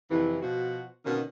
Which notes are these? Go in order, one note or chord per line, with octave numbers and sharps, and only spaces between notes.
F2 A2 C3 E3
B2 F3 F#4
B2 D3 D#3 A#3 C#4